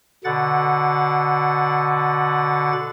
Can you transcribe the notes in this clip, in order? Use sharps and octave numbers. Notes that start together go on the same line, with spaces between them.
B2 D3 F#5 A6